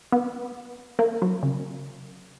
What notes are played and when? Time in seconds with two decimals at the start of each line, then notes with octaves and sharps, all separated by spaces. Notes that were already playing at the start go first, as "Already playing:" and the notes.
0.12 B3
0.99 A#3
1.22 F#3
1.43 C#3